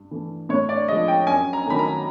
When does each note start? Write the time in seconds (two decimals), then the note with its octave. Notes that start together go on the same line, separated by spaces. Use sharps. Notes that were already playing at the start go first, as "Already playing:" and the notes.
Already playing: G2
0.11 E3 A3
0.49 A2 C#5
0.69 D5
0.88 F3 G#3 D#5
1.08 G5
1.27 F#2 G#5
1.53 A#5
1.66 D#3 F#3 A3 B5
1.79 A#5